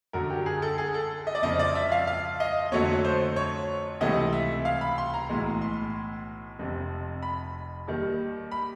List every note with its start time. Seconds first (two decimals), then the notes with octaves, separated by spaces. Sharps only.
0.13 F#2 D3 F#3 A#4
0.30 G4
0.46 G#4
0.62 A4
0.78 G#4
0.94 A4
1.27 D#5
1.35 D5
1.43 F2 C#3 F3 D#5
1.59 D5
1.75 E5
1.92 F5
2.07 F5
2.40 D#5
2.72 F2 D3 F#3 A3 C#5
3.05 C5
3.36 C#5
4.00 C#2 C3 E3 A3 D#5
4.33 E5
4.65 F5
4.81 B5
4.98 C6
5.14 A#5
5.29 B1 A2 E3 G#3
5.61 C6
6.59 F1 F2 C3
7.23 B5
7.87 D#2 D#3 G3
8.52 B5